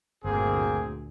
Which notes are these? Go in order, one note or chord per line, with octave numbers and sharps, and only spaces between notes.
G1 D2 A#2 A#3 C4 G#4